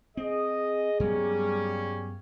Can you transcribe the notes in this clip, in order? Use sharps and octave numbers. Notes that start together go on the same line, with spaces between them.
C4 G#4 D#5
G2 F#3 G3 A#3 B3 C#4